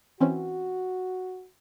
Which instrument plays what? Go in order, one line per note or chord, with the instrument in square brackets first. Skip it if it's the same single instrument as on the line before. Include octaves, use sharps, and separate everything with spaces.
[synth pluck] E3 C4 C#4 [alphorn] F#4